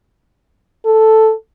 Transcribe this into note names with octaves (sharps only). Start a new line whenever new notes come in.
A4